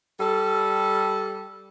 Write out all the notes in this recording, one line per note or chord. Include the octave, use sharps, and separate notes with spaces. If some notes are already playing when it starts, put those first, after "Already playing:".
G3 A4